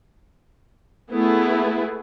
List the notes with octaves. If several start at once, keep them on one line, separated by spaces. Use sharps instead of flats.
A3 B3 E4 G#4